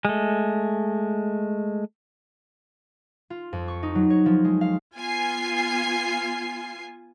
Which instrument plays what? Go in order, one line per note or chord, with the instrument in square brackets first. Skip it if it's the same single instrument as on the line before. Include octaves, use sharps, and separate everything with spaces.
[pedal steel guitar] G#3 A3
[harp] F4
F2
C#6
D#4
F#3
C#5
F3
G#3
F5
[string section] B3 F4 G#5 C7